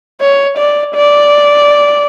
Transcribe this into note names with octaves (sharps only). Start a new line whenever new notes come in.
C#5
D5
D5